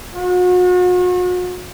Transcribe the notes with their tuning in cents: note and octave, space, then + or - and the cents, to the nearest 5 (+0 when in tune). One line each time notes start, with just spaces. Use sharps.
F#4 -40